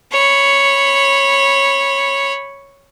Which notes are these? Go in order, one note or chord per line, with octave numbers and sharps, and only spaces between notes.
C#5 B5